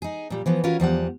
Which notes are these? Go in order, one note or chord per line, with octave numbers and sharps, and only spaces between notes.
D#4 G#4
A#2 G3
E3 F3 B3
C#4 F4 F#4 A#4 B4 C#5
E2 F3 G3 F#5